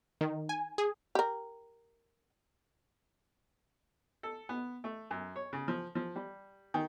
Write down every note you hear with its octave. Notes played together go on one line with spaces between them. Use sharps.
D#3
G#5
G#4
G4 A#4
A4
B3
A3
F#2
C#5
C#3
F3
F3
G3
D#3